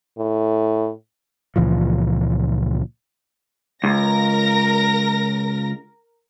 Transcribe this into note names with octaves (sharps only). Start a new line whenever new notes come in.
A2
C#2 A#2 E3 F3
C#2 A#4 A#6